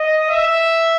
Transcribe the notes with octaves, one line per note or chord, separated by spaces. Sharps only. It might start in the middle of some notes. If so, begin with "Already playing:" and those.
Already playing: D#5
E5